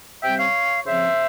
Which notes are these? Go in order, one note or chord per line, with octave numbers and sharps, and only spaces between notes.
C3 G3 C4 E5 G5
C#5 F5
C#3 F3 C4 C5 E5